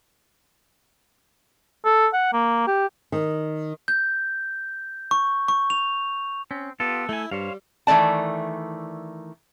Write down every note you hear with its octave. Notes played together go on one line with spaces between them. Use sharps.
A4
F#5
A#3
G4
D#3
G6
C#6
C#6
F7
C4 C#4
B3 F4 G4 A4
A3 E4 G#5
G2 G3 C5 C#5 F5
D#3 E3 A3 D5 A5